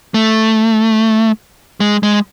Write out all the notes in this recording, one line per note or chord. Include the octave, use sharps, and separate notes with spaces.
A3
G#3
G#3